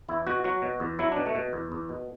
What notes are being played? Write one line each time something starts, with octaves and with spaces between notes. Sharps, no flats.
E2 E4
B2 F#4
F#3 F#4
B2
E2
F#3 E4
D4
B2
A3
B2
E2
E2
B2